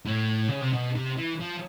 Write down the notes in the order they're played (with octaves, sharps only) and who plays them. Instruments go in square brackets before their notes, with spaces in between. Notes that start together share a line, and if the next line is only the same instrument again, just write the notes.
[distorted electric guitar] A2
C#3
C3
B2
C3
E3
F3